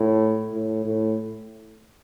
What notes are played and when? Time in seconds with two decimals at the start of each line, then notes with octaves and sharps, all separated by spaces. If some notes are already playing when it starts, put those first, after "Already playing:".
Already playing: A2
0.53 A2
0.85 A2